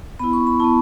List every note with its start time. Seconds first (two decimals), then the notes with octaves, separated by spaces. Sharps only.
0.19 B3 E4 B5
0.33 C#6
0.47 B5
0.60 B3 E4 A5